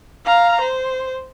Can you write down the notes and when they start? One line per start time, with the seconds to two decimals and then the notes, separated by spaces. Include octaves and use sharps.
0.25 F5 A#5
0.61 C5